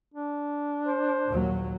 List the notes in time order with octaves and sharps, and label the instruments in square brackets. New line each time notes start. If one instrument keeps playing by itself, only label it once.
[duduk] D4
[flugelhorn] C5
[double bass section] A#1 D#2 F#3